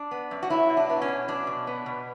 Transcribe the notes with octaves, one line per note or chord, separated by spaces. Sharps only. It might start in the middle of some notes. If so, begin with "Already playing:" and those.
Already playing: D4
B3
F#2
F#4
F#3 E4
B2
D4
B3
C#4
B2
F#3 D4
B2
B3
B2